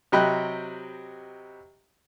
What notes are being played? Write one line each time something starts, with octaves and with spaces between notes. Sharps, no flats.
C3 F#3 D#5 G5 B5 F#6